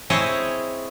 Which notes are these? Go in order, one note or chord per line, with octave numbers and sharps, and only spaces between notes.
C4 E4 G#4 C#5 D#5